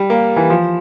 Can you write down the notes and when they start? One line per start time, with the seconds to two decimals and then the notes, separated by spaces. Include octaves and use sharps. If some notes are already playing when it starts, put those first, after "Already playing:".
Already playing: G3
0.10 A#3
0.36 E3
0.50 F3